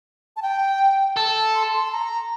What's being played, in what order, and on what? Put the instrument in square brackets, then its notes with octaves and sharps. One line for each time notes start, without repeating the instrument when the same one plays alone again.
[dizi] A5
G5
[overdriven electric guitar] A4 [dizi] A5
[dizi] C6
C6
A5
A#5